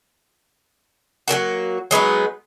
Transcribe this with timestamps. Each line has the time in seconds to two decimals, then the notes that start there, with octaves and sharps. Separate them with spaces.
1.28 F#3 G3 A#3 F#4
1.91 F#3 G#3 B3 D#4